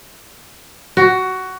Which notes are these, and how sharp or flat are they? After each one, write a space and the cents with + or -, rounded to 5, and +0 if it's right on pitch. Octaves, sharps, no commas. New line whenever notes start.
F#4 +15